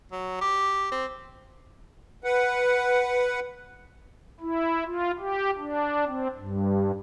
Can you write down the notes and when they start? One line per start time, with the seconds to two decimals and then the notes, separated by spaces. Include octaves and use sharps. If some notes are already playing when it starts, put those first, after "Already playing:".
0.12 F#3
0.41 G4
0.92 C4
2.24 B4 F#5
4.40 E4
4.86 F4
5.19 G4
5.58 D4
6.07 C4
6.38 G2